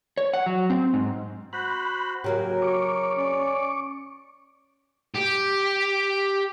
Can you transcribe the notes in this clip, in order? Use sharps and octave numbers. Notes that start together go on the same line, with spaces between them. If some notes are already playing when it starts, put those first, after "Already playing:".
C#5
F#5
F#3
C4
G#2
F#4 C5 B5 F#6
C#3 F#3 A#3 G4 A#4
C#6 D6
C#4 D5
G4